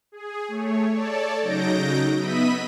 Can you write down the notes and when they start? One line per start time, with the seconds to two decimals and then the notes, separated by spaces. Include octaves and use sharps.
0.12 G#4
0.48 A3 C#5
0.91 A4 C#5 D5 A5
1.41 C#3 F#3 D#4 G6 A#6 D7
2.18 B3 D#5 E5 B5 B6 D#7